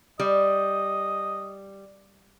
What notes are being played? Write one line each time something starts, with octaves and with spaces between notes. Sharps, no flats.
G3 D#5